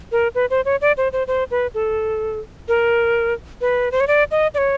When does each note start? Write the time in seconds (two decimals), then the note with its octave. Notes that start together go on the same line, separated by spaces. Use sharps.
0.12 A#4
0.35 B4
0.50 C5
0.65 C#5
0.81 D5
0.97 C5
1.13 C5
1.27 C5
1.51 B4
1.74 A4
2.68 A#4
3.61 B4
3.92 C5
4.00 C#5
4.08 D5
4.31 D#5
4.54 D5
4.58 C#5